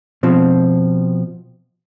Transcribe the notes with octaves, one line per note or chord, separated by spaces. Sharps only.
B2 F3 C4